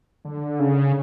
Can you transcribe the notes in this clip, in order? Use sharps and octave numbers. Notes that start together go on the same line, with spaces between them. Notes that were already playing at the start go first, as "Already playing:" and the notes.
D3
C#3